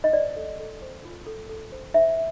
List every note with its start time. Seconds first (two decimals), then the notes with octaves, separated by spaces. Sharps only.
0.04 D#5
0.13 C5 D5
0.36 A4
0.60 A4
0.82 C5
1.05 F4
1.27 A4
1.49 A4
1.72 C5
1.94 C5 E5